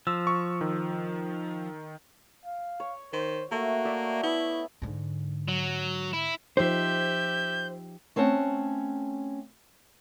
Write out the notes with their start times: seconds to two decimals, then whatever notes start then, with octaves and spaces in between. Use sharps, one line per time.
0.07 F3 E6
0.27 C#6
0.61 D#3
2.45 F5
2.80 C#5
3.13 D#3 C5
3.51 A3 A#3 F#4
3.85 C#5 D5 E5
4.23 B3 E4
4.82 G#2 D3
5.48 F#3
6.13 E4
6.57 F3 D#4 G4 C5 E5 G6
8.16 A3 C4 C#4 F#5 A5